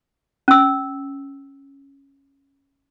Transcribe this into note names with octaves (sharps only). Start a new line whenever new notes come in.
C#4 E6